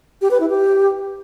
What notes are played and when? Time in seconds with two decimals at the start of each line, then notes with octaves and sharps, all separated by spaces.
0.22 G4
0.31 B4
0.40 E4
0.50 G4